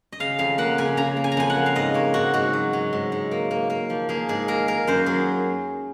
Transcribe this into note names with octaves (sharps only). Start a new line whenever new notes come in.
D#5
C#3 F5
F2 F5
A#3 F#5
C#3 G#5
C#3 A#5
A#3
G#5
A#5
F2 G#5
F#5
A#3
F5
G#2 D#5
A#3 C#5
G#2 F#4
G#2 F#4
F#3
F#3
G#2
G#2
A#3
A#3
A#3
F3
A#3 G#4
G#2 G#4
A#3 A#4
A#3 A#4
F#2 C5
F#3 G#4